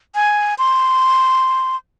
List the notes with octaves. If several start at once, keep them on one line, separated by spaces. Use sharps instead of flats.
G#5
C6